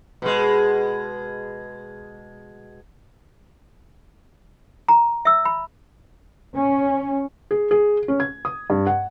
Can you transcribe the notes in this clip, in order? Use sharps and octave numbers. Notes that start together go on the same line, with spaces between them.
B2 G#3
A#5
E5 E6
B5
C#4
G#4
G#4
C#4
G#6
D#6
G2
F#5